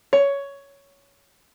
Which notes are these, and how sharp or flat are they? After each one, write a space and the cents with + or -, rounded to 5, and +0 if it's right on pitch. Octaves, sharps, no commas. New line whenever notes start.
C#5 +10